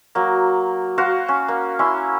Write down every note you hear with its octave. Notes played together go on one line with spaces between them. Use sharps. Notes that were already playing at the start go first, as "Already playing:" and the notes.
F#3 A#3
F#4 C5 F5 F#5
C#4
A#3
C#4 E4 C6